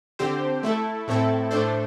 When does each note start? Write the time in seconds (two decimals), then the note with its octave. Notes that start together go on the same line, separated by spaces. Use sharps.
0.19 D3 C4 G4 C5
0.63 A3 E4 A4
1.08 A2 A3 C4 E4 A4
1.51 A2 A3 D4 A4 C5